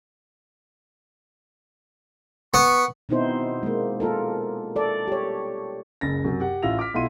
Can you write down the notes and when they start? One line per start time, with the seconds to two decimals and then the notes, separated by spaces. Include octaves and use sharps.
2.54 B3 C#6
3.09 B2 B3 C4 D#4 E4 C5
3.63 G#3 A#3
4.00 A#3 F4 A4 A#4
4.76 A4 D5
5.08 G4 C#5
6.01 F#1 C#2 A6 A#6
6.24 F#2 C3 F#3
6.40 G4 F#5
6.62 A1 E4 F4 E6 A#6 F7
6.79 D6 F6 B6
6.94 B1 B2 E4 F4 C6 D#7